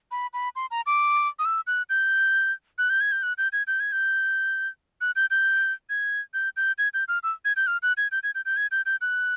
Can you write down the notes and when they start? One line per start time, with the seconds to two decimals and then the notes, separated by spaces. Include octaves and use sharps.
0.11 B5
0.33 B5
0.56 C6
0.71 A#5
0.86 D6
1.39 D#6
1.45 E6
1.67 F#6
1.90 G6
2.78 F#6
2.90 G6
3.01 G#6
3.12 G6
3.23 F#6
3.38 G6
3.53 G#6
3.67 G6
3.80 G#6
3.92 G6
5.01 F#6
5.16 G6
5.31 G6
5.90 G#6
6.34 G6
6.57 G6
6.78 G#6
6.94 G6
7.08 F6
7.23 E6
7.45 G#6
7.56 G6
7.67 F6
7.83 F#6
7.97 G#6
8.12 G6
8.23 G#6
8.35 G6
8.45 G6
8.57 G#6
8.71 G6
8.86 G6
9.01 F#6